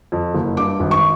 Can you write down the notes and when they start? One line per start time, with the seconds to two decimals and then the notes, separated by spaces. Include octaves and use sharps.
0.12 F2
0.34 F#1
0.57 G2 D6
0.80 G#1
0.91 C#6